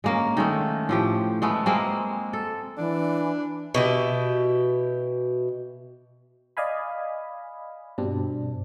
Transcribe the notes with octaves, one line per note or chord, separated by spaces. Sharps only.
G#3 A#3 C#4
D#3 G#3 A3
A2 F3 G4
G#3 A3 B3
G#3 A#3 C4
A4
E3 D4
B2 E4 G4
D5 D#5 F5 G#5 B5
G2 B2 G3 C4 D4